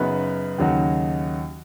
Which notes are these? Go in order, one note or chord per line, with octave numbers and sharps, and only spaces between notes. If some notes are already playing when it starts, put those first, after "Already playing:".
Already playing: F#2 C#3 B3 D#4 B4
D#2 C#3 F#3 D#4 F#4